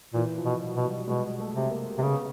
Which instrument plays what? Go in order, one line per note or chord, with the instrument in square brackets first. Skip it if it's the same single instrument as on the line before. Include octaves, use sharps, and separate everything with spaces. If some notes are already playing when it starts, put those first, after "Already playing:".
[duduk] A#2 [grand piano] E3
[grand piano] F3
[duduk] B2
[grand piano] F#3
[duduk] B2
[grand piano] G3
[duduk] B2 [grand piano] G#3
[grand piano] A3
[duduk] C3
[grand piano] A#3
[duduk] C3
[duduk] C#3 [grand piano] B3